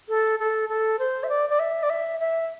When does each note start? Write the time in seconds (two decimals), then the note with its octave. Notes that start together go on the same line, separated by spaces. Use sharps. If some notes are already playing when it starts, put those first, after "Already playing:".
0.09 A4
0.40 A4
0.69 A4
0.99 C5
1.24 E5
1.29 D5
1.50 D5
1.59 E5
1.83 D5
1.90 E5
2.20 E5